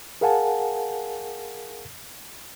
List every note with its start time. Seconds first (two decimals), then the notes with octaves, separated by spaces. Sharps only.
0.21 G#4 A#4 F5 F#5 G#5 A5